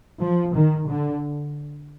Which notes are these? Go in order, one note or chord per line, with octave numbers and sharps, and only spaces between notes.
F3
D#3
D3